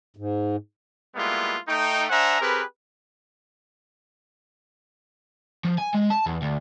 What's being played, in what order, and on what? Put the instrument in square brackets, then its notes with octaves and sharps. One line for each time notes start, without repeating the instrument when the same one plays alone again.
[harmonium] G#2
[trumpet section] G3 G#3 A#3 B3 E4 F4
A3 D#4 G5
D4 C5 E5 F#5 G#5 A#5
C4 G4 G#4 A#4 B4
[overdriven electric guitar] F3
G#5
G#3
A5
E2
D2